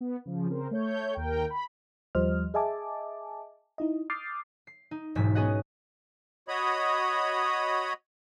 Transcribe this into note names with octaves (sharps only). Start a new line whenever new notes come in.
B3
C#3 F3
C#3 C4 A#4 C5
A3 C#5 G6
D#2 A#4 G5
B5
D#2 F3 G3 C5 D#5 F6
G#4 D#5 E5 G#5 A5 D6
D#4 E4 D#5
D6 D#6 F6 G6 A6 C7
C7
D#4
E1 B1 G#2 B6
B3 C#4 G#4 D#5 F#5
F#4 C#5 D#5 B5 D#6